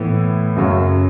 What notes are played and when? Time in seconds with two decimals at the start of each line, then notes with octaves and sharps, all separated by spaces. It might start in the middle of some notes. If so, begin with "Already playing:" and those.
Already playing: A2 E3 B3 E4
0.56 F#2 C#3 F#3 C#4